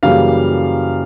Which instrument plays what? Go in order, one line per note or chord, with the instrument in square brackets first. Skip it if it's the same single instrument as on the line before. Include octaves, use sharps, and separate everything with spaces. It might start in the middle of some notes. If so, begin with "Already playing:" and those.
[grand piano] F#2 C#3 E3 G3 A#3 F5